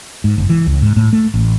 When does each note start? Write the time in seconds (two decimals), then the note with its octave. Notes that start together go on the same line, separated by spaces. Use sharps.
0.24 G#2
0.38 F#1
0.50 E3
0.66 C#2
0.82 G#2
0.96 A2
1.13 A3
1.34 A1